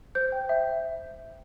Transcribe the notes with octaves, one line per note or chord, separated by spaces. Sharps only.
C5 G6
G5
E5